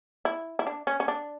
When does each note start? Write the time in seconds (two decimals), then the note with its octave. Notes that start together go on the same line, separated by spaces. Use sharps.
0.25 E4
0.59 E4
0.67 D4
0.87 C#4
1.00 C#4
1.08 D4